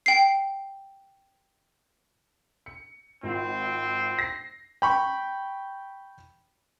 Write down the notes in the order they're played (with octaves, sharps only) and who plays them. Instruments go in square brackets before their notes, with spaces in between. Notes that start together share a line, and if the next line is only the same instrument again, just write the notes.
[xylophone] G5 C7
[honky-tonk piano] C#7
[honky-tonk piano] G#1 F4 [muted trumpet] C4
[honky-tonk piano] A#6 C7
[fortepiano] G5 B5 C#6